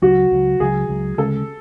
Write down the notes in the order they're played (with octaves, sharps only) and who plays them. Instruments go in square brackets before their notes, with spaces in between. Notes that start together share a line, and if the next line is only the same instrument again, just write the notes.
[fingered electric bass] C#2 C#3 F#3 [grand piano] F#4
[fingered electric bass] C#2 C#3 F#3
[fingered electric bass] C#2 C#3 F#3 [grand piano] G#4
[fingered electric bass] C#2 C#3 F#3
[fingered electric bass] D2 C#3 G#3 C#4 [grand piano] A4